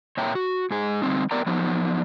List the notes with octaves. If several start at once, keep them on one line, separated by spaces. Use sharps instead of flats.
A#2 C#5 E5 G5 A#5
F#4
G#2 G#4
D3 G3 C4 D#4
B3 G4 A#4 D5 G5 A#5
F3 F#3 B3 D#4 F#4